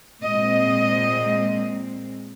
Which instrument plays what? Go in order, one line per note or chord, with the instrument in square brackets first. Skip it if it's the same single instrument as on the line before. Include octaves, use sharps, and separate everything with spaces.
[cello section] A#2 G#3 C4 D#5